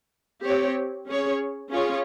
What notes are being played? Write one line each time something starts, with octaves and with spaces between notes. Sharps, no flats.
C4 G4 C#5
C#4 G#4 C#5
C#4 F4 G#4 C#5